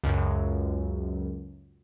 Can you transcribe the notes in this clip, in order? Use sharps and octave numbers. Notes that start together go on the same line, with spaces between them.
C#2 F#2